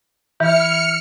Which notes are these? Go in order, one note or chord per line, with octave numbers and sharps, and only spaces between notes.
E3 E4 F6 C#7